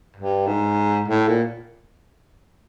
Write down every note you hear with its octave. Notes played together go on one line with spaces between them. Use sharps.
G2
G#2
A2
A#2